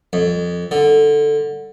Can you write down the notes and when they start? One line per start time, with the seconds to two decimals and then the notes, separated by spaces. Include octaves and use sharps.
0.13 F2
0.71 D3